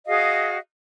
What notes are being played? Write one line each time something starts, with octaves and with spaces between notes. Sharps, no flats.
F#4 G#4 D#5 F5